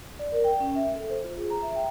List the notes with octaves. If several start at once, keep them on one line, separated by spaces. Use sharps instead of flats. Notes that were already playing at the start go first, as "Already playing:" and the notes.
D5
A#4
G5
C#4
E5
A4
C5
F4
G#4
A#5
E5
G5